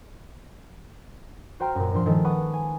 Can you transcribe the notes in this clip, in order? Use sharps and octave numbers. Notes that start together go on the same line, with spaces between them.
F#4 C5 G5 A#5 C6 F6
F#2 A#2
G2 A#2 F3 C6
D#3 F3 G#3 A4
B4 F#5 B5 C#6 D#6
G#5